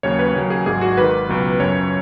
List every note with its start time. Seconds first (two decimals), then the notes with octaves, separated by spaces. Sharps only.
0.03 D#2 C#3 F#3 C#5
0.19 B4
0.35 D#2 C#3 F#3
0.50 G#4
0.66 G#1 G#2 F#3 G#4
0.81 F#4
0.97 G#1 G#2 D#3 B4
1.29 C#2 B2 F#3
1.59 F#2 C#3 F#3 C#5